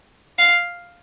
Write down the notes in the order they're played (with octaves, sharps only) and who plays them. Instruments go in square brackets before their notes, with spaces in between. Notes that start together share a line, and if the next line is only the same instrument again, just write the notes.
[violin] F5